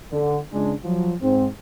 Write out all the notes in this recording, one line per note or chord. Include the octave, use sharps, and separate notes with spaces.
D3
C#2 G#3 D4
F3 F#3
G#2 C4